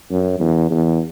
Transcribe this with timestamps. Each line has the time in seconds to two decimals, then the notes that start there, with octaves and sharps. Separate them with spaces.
0.11 F#2
0.40 E2
0.70 E2